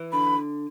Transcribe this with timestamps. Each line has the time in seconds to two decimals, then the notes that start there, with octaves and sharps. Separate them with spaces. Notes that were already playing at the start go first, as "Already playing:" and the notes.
Already playing: E3
0.12 D3 B5